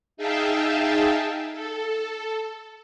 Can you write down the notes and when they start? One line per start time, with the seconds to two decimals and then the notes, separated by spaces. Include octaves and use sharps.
0.17 D#4 G#4 E5 F5 G5 A5
1.52 A4